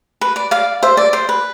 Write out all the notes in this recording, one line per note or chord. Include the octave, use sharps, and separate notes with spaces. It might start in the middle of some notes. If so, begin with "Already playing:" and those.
B4
D5
D5 F5
C5 E5
D5
C5
B4